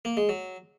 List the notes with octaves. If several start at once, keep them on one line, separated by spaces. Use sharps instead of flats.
A#3
G#3
F#3